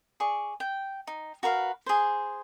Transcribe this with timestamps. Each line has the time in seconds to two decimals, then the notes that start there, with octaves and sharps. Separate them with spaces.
0.20 G#4 D5 C#6
0.60 G5
1.07 D#4
1.43 F#4 A#4 B4 F5
1.86 G#4 C5